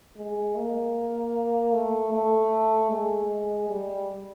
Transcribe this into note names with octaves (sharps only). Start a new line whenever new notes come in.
G#3
A#3
A3
A3
G#3
G3